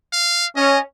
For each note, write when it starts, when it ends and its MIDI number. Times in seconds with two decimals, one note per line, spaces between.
0.13 0.46 77
0.56 0.79 61
0.56 0.79 75